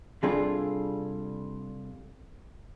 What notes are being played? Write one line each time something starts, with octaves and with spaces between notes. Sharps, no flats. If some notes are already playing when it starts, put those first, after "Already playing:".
C3 G3 D4 F4 G#4 A4